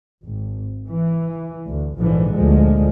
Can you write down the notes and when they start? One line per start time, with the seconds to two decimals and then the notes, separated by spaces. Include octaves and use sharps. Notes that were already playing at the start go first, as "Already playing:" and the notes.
0.24 G#1
0.87 E3
1.68 D2
1.99 A#1 G#2 D3 E3 F3
2.34 D2 A#2 F3 G#3